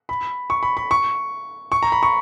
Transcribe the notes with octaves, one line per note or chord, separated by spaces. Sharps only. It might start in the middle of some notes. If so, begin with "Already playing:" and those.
B5
C#6
B5
B5
C#6
C#6
A#5
B5
C#6